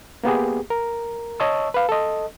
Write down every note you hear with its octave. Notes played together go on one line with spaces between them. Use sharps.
A#3 B3 G4 G#4
A#4
C#5 D#5 A5 C#6 E6
B4 F5
A4 D#5